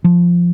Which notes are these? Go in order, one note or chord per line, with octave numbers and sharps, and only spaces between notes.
F3